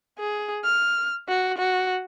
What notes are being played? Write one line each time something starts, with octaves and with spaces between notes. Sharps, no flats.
G#4
F6
F#4
F#4